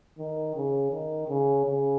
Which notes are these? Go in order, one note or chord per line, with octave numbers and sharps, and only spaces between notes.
D#3
C#3
D#3
C#3
C#3